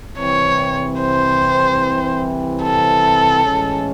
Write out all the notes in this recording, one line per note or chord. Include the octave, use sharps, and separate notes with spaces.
C2 C3 E3 C4 C#5
C5
A4
A2 E3 G#3 C#4